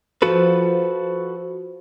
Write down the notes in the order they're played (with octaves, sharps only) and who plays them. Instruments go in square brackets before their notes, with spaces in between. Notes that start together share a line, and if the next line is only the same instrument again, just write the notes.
[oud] F3 [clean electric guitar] F#4 A4 B4